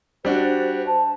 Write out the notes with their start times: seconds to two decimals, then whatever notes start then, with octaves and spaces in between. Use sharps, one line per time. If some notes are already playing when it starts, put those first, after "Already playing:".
0.25 G3 D4 F#4 C5
0.86 A5